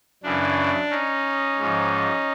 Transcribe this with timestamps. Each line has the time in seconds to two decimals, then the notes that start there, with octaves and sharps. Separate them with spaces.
0.23 F#2 C#3 E3 D4
0.91 C#4 D#4
1.59 G#2 F3